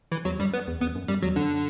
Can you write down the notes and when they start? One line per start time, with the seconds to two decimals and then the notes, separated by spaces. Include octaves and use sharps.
0.12 E3
0.25 E2 F#3
0.39 F#2 G3
0.54 B3
0.68 E2
0.81 E2 B3
0.95 F#2
1.08 F#2 G3
1.23 E2 F#3
1.36 F#2 D3